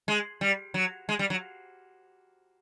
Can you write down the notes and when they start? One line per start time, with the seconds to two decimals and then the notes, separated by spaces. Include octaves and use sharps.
0.08 G#3
0.41 G3
0.74 F#3
1.09 G#3
1.19 G3
1.30 F#3